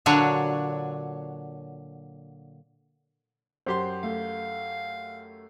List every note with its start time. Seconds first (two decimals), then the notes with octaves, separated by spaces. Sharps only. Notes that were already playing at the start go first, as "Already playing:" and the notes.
0.06 A#2 D3 F#3 D4 C#5
3.66 F#2 G4 C5 C6
4.03 A3 F5